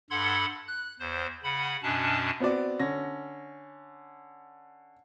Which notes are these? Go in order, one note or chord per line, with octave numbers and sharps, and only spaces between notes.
G2 A4 F#5 B5 C6 G#6
F#6
E2 C5
C#3 F#5 B5
F#2 B2 C#4 D4 A5
B3 C4 F#4 D5
D3 C#4 A#6